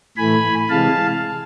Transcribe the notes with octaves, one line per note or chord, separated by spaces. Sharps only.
A2 E3 A3 G#5 B5
C3 E3 G#3 F5 A5